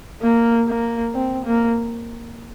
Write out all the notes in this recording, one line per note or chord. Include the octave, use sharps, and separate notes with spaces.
A#3
A#3
C4
A#3